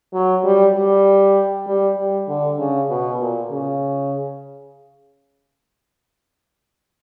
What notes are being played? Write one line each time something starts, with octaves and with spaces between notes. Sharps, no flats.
F#3
G3
G3
G3
G3
D3
C#3
B2
A#2
C#3